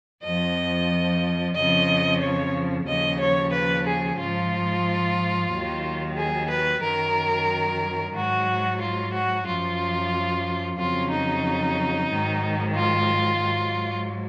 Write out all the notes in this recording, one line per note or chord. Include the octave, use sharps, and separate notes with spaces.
F2 F3 D#5
F2 C#3 F3 D#5
C#5
D#2 C#3 F3 D#5
C#5
B4
G#4
G#2 F3 F4
D#2 D#3 F#3
G#4
B4
F#2 D#3 F#3 A#4
G#2 F#3 F#4
F4
F#4
F#2 F3 F4
F2 C#3 F#3 F4
D#4
G#2 D#3 F#3
F4
G#2 F#3